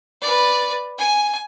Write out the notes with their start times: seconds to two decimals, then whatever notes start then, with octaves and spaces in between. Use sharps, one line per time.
0.22 B4 D5
0.98 G#5